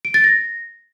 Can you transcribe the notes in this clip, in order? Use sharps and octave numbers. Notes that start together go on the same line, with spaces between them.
D7
A6
A#6